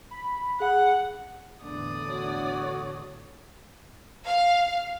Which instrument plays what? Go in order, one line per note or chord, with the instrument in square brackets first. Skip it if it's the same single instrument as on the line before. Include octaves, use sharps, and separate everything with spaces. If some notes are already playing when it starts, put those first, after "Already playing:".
[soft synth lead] B5
[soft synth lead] G#4 [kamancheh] F#5
[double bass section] E2 A2 D3 [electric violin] D5 D#6
[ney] F#4 [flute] C#5
[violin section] F5